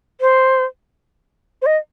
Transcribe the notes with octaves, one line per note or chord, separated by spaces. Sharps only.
C5
C5
D#5